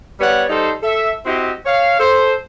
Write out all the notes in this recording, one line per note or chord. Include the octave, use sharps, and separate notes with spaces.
G3 B3 C#5 D5 F#5
G3 D#4 A4 C5
A4 E5
C4 E4 F#4 G4 D#5
C#5 F5
A4 C5